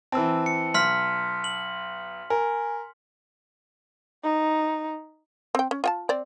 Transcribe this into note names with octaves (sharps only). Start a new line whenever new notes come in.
E3 C4 A5 E6
C#7
B1 C6 F6 B6
F#7
A#4 G#5
D#4
C4 G5
C#4
F4 G5 A5
C4 D5